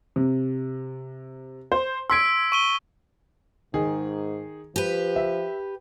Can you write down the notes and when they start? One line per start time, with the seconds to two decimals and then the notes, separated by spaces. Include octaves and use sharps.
0.16 C3
1.72 C5
2.10 C6 E6 G#6 B6 D7
2.52 C#6 D#7 G7
3.74 G#2 D#3 G#4
4.76 F3 G4 B4
5.16 E5